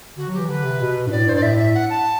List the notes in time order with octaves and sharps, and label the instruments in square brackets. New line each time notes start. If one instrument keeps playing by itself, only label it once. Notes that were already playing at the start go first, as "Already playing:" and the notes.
[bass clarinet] D3 [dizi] F#4
[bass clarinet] F#3
[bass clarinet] E3 [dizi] G4
[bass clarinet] D3 [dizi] B4
[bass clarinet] C3
B2
G2
[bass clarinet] A2 [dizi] D5
[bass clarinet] G2 [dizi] C5
[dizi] D5
[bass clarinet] A2 [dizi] E5
[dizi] E5
F#5
A5